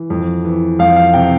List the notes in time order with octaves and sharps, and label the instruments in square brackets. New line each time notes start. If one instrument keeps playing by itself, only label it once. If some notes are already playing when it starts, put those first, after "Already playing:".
Already playing: [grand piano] E3
F2
E3
F2 F5
F5
C3 G5